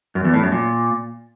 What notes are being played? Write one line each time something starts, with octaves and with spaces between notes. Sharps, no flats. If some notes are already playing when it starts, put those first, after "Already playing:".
F#2
E2
A2
F#2
A#2